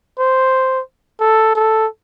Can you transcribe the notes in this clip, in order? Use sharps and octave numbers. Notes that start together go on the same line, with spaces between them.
C5
A4
A4